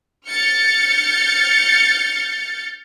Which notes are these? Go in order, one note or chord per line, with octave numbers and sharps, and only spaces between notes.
F6 G6 A6 C#7